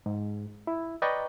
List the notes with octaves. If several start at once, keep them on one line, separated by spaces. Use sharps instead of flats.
G#2
E4
B4 D5 D#5 G5 A#5 C#6